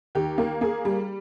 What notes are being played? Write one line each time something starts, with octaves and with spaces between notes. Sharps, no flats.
D#2 G4
A#3
A#3 G#4
G3